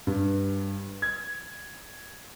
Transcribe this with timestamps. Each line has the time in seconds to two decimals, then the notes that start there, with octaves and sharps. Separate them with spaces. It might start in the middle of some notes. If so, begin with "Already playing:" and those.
0.07 G2
1.02 G#6